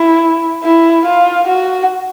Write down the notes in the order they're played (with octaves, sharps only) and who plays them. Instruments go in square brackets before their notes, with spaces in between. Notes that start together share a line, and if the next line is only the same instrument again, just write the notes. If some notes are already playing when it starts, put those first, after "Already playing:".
Already playing: [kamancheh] E4
E4
F4
F#4